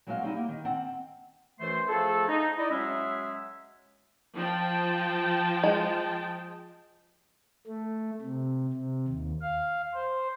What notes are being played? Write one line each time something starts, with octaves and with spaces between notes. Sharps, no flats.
F#3 G#3 C4 F#4 F5
G3 C4 D#4 E4
A#3
D#3
C4 F#5 A5
F#2 E3 A3 C5 C6
F3 A3 G#4 A4
D#4
D#4 E4 D5 D#5
F#3 G#3 C#4 G#4 E5
F3 G5 A5
G#3
A3
C3
C3
D#2
F5
C5